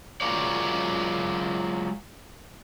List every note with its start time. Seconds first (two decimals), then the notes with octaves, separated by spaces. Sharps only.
0.21 F#3 G#3 F4 A#4 C#5 D5